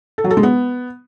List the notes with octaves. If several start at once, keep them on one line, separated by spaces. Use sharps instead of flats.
A4
F#3
A4
G#3
B3